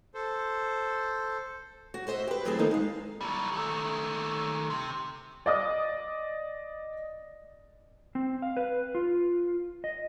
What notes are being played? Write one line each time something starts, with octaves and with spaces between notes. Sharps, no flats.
A4 C5
F#4
F#4 C5 D#5 E5
G4 B4
D2 F#3 C4 E4 G#4 A4
D#3 F3 G3 A3 A#3 D#4
G#3 F5
F#3 G3
D#3 A3
C3
D5 D#5 D#6
C4
F5
B4
F4
D#5